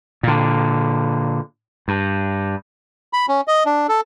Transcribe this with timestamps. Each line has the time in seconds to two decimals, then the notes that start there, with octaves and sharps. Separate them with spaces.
0.23 A#2 D3
1.88 G2
3.13 B5
3.29 C#4
3.48 D#5
3.66 D4
3.89 A4